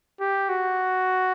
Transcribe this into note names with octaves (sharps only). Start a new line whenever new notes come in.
G4
F#4